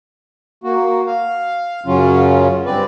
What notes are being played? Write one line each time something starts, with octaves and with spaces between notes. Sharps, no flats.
A#3 F#4
F5
F#2 C#3 F#3 C#4 F4
G2 C4 B4 D5